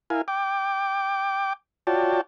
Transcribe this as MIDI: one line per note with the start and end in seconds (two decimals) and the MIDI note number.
0.10 0.22 64
0.10 0.22 70
0.10 0.22 77
0.10 0.22 80
0.28 1.53 79
0.28 1.53 86
1.87 2.21 65
1.87 2.21 66
1.87 2.21 73
1.87 2.21 74
1.87 2.21 79
1.87 2.21 81